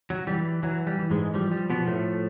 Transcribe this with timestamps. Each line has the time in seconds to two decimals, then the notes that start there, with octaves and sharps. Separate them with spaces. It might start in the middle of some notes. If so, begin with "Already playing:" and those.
0.10 F#3
0.27 E3 G3
0.63 E3 F#3
0.87 G3
0.99 E3
1.10 G#2 G#3
1.34 F3 G3
1.52 G3
1.70 B2 F3 B3
1.87 A2 A3